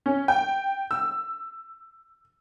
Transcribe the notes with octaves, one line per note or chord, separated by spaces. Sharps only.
C#4
G5
E6